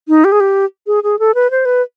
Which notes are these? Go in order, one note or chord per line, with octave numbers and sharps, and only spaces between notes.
D#4
G4
G#4
G4
G#4
G#4
A4
B4
C5
B4